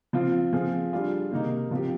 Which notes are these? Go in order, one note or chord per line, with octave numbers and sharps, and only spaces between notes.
F3 C4 F4
F3 C4 F4 G#4
G3 D4 F4 G#4
C3 D#3 A#3 D#4
F3 C4 G4